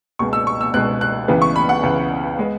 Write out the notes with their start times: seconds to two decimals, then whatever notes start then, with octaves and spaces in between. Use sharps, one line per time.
0.19 C#2 B2 G#3 C#6
0.33 E6
0.47 C#6
0.61 E6
0.74 C#2 B2 G#3 F#6
1.01 F#6
1.28 C#2 C#3 E3 B3
1.42 C#6
1.56 B5
1.69 F#5
1.83 C#2 C#3 E3 B3
2.39 G#3 B3